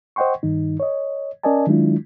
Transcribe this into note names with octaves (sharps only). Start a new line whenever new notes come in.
C5 D#5 F#5 G5 C6 C#6
G2 D#3 D#4
C#5 D#5
C#4 A#4 D5 D#5 G#5 A5
D#3 F#3 G#3 D4 E4 F4